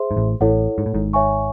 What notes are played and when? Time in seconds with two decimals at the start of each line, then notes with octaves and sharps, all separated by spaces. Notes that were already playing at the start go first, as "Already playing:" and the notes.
Already playing: G#4 C5 E5 C6
0.11 G#2
0.16 A1 A2
0.41 A1 A2 E4 A4 C#5 F#5
0.78 G#2
0.86 A2
0.94 G#1 G#2
1.13 C#5 E5 G#5 C#6